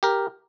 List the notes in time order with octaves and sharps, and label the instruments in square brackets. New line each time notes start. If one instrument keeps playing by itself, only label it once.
[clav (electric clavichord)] G4 A#4